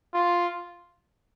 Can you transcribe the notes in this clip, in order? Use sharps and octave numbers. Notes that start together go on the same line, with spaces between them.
F4